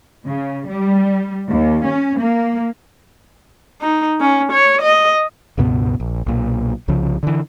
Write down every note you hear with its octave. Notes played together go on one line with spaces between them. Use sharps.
C#3
G3
D#2
C#4
A#3
D#4
C#4
C#5
D#5
C#2 G2 B2 B3
A#1
B1 A#2
C2 C#3 F3
D3 E3